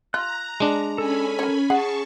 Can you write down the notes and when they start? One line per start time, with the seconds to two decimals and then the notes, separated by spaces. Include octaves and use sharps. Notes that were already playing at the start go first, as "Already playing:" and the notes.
0.14 F4 A#5 F#6
0.60 G#3 D4
0.98 C#4 A4 G#5 B5
1.39 A#4 C#5
1.70 G#4 F#5 A5 C#6